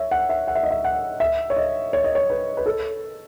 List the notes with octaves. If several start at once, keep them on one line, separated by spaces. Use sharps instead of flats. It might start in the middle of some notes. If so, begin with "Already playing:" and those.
Already playing: C#5 E5
F#5
E5
F#5
E5
D#5
E5
F#5
E5
C#5
D#5
C#5
D#5
C#5
B4
B4
A4